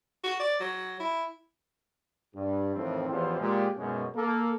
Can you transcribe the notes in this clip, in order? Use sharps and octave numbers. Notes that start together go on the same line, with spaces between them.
F#4
D5
F#3
E4
G2
F2 A2 D#3 E3 C4
A1 E2 F3 F4 G4 C5
A#2 G#3 G4
B1 F#2 B2 G#3 C#4
A#3 A4